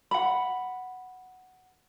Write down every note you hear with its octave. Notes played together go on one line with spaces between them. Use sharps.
F#5 B5